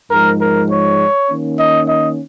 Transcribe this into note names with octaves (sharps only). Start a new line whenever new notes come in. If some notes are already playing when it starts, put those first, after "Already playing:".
G#2 F3 G#3 A#4
A#4
C#5
D#3 A#3 C#4
D#5
D#5